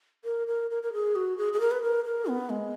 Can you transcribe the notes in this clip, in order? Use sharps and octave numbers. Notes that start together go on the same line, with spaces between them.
A#4
A#4
A#4
A#4
G#4
F#4
G#4
G#4
A#4
B4
A#4
A#4
B3
G#3